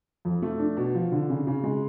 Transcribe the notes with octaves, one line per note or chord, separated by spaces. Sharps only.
F2
A3
D4
B2
F3
D3
C#3
C#3
G#3